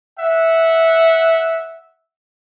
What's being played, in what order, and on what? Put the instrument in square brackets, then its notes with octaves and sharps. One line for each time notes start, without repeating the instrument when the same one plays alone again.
[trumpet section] E5 F#5